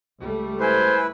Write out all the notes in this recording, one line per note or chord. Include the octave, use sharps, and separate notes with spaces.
C#2 G3 A3
E4 B4 C5 G#5